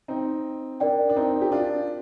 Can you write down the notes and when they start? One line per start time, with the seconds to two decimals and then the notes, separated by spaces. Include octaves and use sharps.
0.08 C4 D#4
0.80 D4 A#4 D5 G5
1.09 D4
1.16 C4 D#4
1.41 G4
1.52 D4 F4